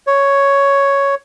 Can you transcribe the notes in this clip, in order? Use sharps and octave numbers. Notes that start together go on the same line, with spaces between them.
C#5